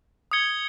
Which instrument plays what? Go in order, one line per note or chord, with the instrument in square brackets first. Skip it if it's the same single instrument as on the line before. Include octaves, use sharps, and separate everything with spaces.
[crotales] D#6 G#6 C#7 G7